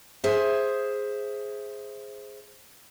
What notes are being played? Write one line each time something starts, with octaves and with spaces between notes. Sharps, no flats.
G#4 C5 E5